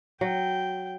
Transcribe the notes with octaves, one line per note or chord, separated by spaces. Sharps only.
F#3 G5